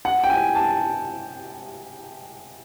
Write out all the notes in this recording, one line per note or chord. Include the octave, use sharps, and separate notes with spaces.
F#5
G5
G#5
A5